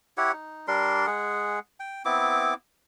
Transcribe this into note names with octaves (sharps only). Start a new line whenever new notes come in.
E4 G4 C#5 F#5
D#4
G3 D4 A#4 C6
G#3 G#4 F#5
G5
B3 C4 E4 D6